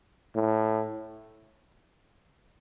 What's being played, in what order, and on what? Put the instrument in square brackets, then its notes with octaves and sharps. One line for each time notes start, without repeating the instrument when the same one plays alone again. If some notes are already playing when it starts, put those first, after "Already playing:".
[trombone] A2